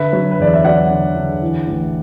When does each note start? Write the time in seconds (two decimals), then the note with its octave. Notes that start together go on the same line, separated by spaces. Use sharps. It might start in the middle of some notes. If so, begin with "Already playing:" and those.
Already playing: D3 B4 E5
0.13 F#3
0.31 B4
0.39 E2 D5
0.54 E5
0.64 F#3 D5 F#5
0.90 D3
1.16 D3
1.42 E3
1.67 A1